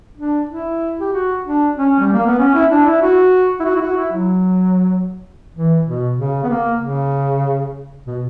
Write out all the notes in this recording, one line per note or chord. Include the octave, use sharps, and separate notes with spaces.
D4
E4
G4
F#4
D4
C#4
G3
A#3
B3
C#4
E4
D4
E4
F#4
E4
F#4
E4
F#4
E4
F#3
E3
B2
C#3
B3
A#3
C#3
B2